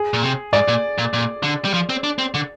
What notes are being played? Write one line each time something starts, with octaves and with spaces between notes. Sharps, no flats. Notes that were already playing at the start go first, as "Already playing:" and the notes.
Already playing: G#4
A#2
C3
G#2 D5
A#2
A#2
A#2
D3
G3
F3
C4
D4
C4
D3